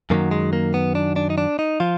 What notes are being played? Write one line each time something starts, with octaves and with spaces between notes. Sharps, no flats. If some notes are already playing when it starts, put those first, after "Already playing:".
F#2 D#3 F#3 A#3
G#3
A#3
B3
D4
D4
D#4
D4
D#4
F3 F4